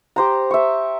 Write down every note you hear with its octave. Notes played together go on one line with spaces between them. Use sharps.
G4 C5 A#5
E5 C#6